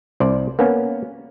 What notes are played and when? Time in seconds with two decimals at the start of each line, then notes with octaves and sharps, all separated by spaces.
0.20 C2 C5 D5
0.59 A#3 B3 C#4